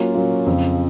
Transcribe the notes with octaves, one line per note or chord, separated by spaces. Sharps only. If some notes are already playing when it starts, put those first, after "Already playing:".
Already playing: F#3 A#3 C#4 F4
F#3 A#3 C#4 F4
F2 C#3 F3